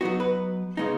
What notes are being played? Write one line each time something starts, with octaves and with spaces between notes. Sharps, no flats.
F#3 B3 D#4 F#4
B4
C#3 G#3 B3 D#4